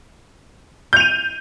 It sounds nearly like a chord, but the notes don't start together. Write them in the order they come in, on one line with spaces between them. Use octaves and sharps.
G6 F7 D#7